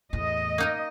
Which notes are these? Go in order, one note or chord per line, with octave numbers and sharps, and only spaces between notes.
E2 A2 D#5
A#3 D#4 A#4